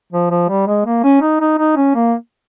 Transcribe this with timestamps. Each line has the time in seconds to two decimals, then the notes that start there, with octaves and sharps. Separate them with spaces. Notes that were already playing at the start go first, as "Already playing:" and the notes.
0.12 F3
0.30 F3
0.49 G3
0.67 G#3
0.86 A#3
1.04 C#4
1.22 D#4
1.41 D#4
1.59 D#4
1.76 C#4
1.95 A#3